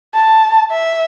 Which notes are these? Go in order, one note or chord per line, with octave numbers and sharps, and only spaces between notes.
A5
E5